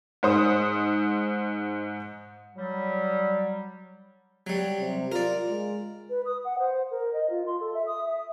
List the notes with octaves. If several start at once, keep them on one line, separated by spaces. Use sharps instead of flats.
G#2 C5 D#6
F#3 G3
F#3 G3
C3
F4 A#4 D5
G#3
B4
D#6
F#5
C5
A#4
D#5
F4
C6
A4
E5
D#6
E5